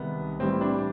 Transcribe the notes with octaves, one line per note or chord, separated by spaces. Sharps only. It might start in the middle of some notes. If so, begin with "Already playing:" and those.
Already playing: C2 C3 D#3 G#3 B3
A2 E3 G3 C4
D4